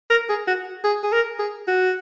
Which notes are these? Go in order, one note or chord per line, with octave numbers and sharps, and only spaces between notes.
A#4
G#4
F#4
G#4
G#4
A#4
G#4
F#4